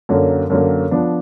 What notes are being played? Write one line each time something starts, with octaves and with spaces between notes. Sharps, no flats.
F#2 D3 F#3 A#3
F#2 D3 F#3 A#3
F3 B3 D4